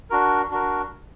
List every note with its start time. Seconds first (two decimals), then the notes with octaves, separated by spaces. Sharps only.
0.10 D4 F#4 A#4
0.50 D4 F#4 A#4